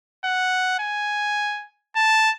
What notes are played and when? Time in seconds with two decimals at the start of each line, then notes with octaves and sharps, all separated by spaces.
0.25 F#5
0.79 G#5
1.96 A5